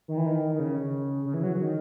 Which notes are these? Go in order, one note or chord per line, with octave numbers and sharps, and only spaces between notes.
D#3
E3
D#3
D#3
C#3
C#3
E3
F#3
D#3